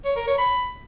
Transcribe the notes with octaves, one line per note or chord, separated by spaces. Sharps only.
C#5
A#4
C#5
B5